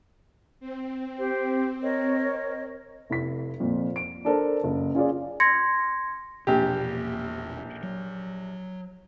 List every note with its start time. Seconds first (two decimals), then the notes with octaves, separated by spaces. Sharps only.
0.60 C4
1.17 G4 C5
1.81 A#4 C#5 D#5
3.10 F1 E4 B6
3.60 F2 A#2
3.96 D7
4.25 D4 A4 A#4 C5
4.64 F#1
4.95 C#4 F4 G#4 D5
5.40 C6 G#6 A#6 C#7
6.47 E1 A#1 B2 A#3 G4
7.83 F#3